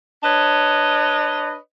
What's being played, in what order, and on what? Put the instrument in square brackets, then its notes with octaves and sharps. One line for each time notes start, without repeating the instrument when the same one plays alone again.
[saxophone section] D4 B4 C#5 D#5